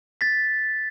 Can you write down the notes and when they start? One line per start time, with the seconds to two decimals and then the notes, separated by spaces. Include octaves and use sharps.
0.21 A6 B6